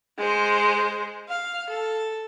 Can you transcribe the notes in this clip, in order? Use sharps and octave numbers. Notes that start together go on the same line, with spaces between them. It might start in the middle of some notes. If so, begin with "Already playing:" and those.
G#3 C5
F5
A4